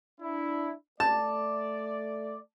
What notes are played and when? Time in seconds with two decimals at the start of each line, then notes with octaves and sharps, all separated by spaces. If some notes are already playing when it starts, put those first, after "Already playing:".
0.21 D4 E4
1.00 A3 D5 A5